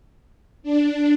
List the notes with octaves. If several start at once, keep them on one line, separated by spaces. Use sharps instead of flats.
D4